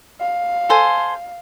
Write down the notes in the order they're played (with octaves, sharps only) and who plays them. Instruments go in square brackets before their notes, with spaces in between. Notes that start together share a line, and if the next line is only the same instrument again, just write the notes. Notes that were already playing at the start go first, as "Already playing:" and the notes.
[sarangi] F5
[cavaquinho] A4 C5 G#5